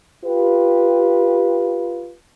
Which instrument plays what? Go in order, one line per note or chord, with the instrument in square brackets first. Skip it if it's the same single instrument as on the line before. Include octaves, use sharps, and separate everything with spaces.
[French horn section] F4 G4 B4